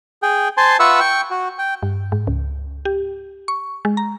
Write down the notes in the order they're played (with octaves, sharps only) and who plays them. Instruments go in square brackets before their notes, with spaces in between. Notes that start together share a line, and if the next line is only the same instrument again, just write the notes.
[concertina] G#4 G5
C5 G#5 A5 C6
F4 B4 E5 F#5 C#6 E6
G5 C#6
F#4
G5
[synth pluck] G2
G#2
C#2
G4
C#6
G#3
A#5